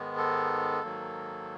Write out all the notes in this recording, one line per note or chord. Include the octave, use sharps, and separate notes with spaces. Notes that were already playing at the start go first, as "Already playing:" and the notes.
Already playing: G#2 D#3 G#3 B3
A4
G#2 D#3 F#3 A#3